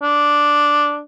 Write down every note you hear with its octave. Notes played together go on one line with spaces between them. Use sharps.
D4